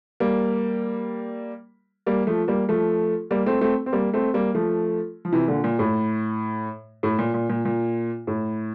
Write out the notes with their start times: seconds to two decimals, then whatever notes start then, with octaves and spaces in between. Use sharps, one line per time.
0.20 G3 A#3
2.07 G3 A#3
2.27 F3 A3
2.48 G3 A#3
2.69 F3 A3
3.31 G3 A#3
3.46 A3 C4
3.61 A3 C4
3.86 C4
3.93 G3 A#3
4.14 A3 C4
4.34 G3 A#3
4.55 F3 A3
5.25 F3
5.32 C3 E3
5.48 A#2 D3
5.64 A#2
5.79 A2
7.03 A2
7.19 A#2
7.34 A#2
7.50 A#2
7.65 A#2
8.27 A2